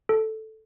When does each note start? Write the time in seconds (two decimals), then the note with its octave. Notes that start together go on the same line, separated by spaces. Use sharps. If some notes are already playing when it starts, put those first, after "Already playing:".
0.09 A4